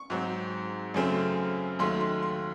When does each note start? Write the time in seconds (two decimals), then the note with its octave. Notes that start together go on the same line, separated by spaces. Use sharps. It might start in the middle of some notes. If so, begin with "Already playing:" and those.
Already playing: C#6
0.10 G#2 F#3 C4
0.94 F#2 C#3 F#3 A3 C4
1.79 D#2 D#3 F#3 A3 C6
2.01 C6
2.23 C6